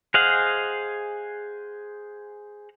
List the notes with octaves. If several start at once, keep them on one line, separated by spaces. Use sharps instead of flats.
G#4 C5 D#5 F5 F#5